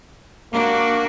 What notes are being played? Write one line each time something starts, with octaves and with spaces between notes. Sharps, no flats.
A#3 D4 F#4